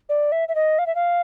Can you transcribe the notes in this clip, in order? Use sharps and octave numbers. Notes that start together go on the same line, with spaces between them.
D5
E5
E5
D#5
F5
E5
F5